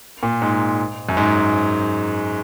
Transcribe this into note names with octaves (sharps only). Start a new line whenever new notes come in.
A#2
G#2
F#2
G#2